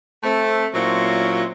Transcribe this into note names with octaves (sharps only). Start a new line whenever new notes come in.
A3 C4
A#2 F#3 C4 C#4 E4 F4